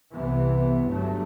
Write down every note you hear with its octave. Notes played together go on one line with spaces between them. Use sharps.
C2 C3 E3 B3
G1 G2 F#3 A3